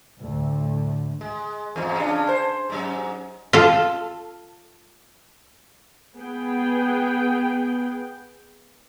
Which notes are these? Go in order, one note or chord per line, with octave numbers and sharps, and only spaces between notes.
D2 A2 D3 A3
G#3
E2 G#2
C#3 G#3 D4
C5
G#2 F#3 C#4
F4 A4
B3 G#4 G5